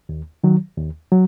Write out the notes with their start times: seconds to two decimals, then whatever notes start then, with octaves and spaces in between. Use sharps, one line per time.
0.09 D#2
0.44 D#3 F#3
0.77 D#2
1.12 F#3